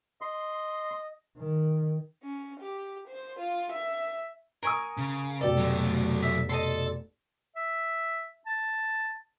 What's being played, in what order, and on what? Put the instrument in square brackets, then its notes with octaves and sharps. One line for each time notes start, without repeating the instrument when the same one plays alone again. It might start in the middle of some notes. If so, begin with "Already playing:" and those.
[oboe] D#5 [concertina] C6
[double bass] D#3
[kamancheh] C#4
G4
C5
F4
E5
[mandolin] A#4 G#5 [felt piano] A#5 C#6 D#6
[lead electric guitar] C#3
[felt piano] F1 B2 D5 [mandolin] G4 A4
[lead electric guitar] F#3 A3
[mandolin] E5
[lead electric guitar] A4 [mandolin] D#5 A5 C6
[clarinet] E5
A5